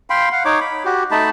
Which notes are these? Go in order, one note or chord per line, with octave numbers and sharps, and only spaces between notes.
F5 G5 B5 C6
F5 F#5
D#4 C#5 D6
B5
F#4 G4
A3 D#4 A5 B5